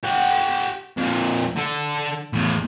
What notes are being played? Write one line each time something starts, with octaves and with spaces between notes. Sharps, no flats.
G4 F#5
F2 A#2
D3 A4
E2 A2